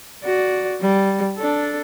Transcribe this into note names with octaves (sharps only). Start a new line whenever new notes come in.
F#4 D5
G3
D4 A4